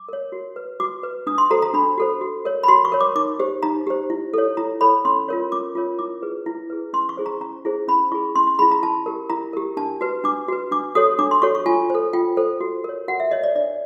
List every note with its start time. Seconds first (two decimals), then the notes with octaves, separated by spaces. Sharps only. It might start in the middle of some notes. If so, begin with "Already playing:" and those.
Already playing: D6
0.09 A#4 C#5
0.32 F#4
0.56 B4
0.80 F#4 D6
1.03 B4
1.27 D4 D#6
1.38 C6
1.51 F#4 A4 C5 A#5
1.62 A#5
1.74 D4 B5
1.97 F#4 A4 C5
2.21 F#4
2.45 A#4 C#5
2.63 B5
2.68 F#4 C6
2.85 C#6
2.92 A#4 C#5
3.01 D6
3.15 D#4 D6
3.40 G4 C5
3.63 D#4 A#5
3.87 G4 C5
4.10 E4
4.34 A4 C#5
4.57 E4 A#5
4.81 A4 C#5 B5
5.05 C#4 C6
5.28 F4 A#4 C#5
5.52 C#4 D6
5.75 F4 A#4 C#5
5.99 E4 D6
6.22 G#4 B4
6.46 E4
6.70 G#4 B4
6.93 C#4 C6
7.09 C#6
7.17 E4 G#4 C5
7.26 A#5
7.41 C#4 A#5
7.65 E4 G#4 C5
7.88 C#4 B5
8.12 E4 G#4 C#6
8.35 C#4 C6
8.47 C6
8.59 E4 G#4 B5
8.71 A#5
8.82 E4 A5
9.06 G4 A#4
9.30 E4 A#5
9.53 G4 A#4
9.77 D4 A5
10.01 F#4 B4
10.24 D4 D6
10.48 F#4 B4
10.71 D4 D6
10.95 F#4 A4 C#5 D#6
11.19 D4 D6
11.31 C6
11.42 F#4 A4 C#5 C#6
11.55 C#6
11.66 F4 G#5
11.90 A4 C5
12.13 F4 G5
12.37 A4 C5
12.60 F#4
12.84 A#4 C#5
13.08 F#4 F#5
13.20 E5
13.31 A#4 C#5 D#5
13.44 D5
13.55 D4 D5